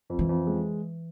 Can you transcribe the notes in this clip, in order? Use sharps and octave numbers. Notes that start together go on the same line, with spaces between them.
F2
E3
F2
G#3